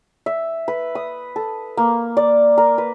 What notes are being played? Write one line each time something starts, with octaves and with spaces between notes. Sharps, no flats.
E5
B4
D#6
A4
A#3
D5
A#4
B4